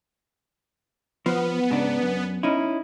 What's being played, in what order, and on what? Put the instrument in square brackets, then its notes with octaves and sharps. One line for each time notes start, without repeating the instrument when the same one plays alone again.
[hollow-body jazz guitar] F3 [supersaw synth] B3
[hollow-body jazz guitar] G#2 C#3 D4
F#2
C#4 D#4 E4